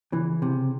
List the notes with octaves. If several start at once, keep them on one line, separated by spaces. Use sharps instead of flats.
C#3 E3
C3